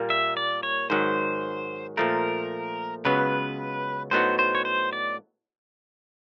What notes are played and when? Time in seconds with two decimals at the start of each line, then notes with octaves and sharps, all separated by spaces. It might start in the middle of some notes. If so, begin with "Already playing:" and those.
Already playing: A#2 G3 A#3
0.10 E5
0.37 D5
0.63 C#5
0.90 G#2 D#3 F#3 C5
1.97 A#2 F3 A3 A#4
3.05 C#2 C#3 F#3 B3 B4
4.11 A2 F#3 B3 D#4 F#4 C5
4.39 C5
4.55 C#5
4.65 C5
4.93 D5